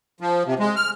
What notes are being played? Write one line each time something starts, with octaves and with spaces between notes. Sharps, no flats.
F3
C3
G#3
F6